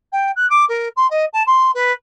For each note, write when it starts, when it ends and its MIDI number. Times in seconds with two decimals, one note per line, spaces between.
0.12 0.31 79
0.36 0.48 90
0.50 0.65 86
0.69 0.89 70
0.96 1.09 84
1.10 1.25 75
1.33 1.43 81
1.47 1.71 84
1.74 1.92 71